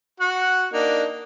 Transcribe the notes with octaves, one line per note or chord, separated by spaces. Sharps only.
F#4 F#5
A#3 D4 D#4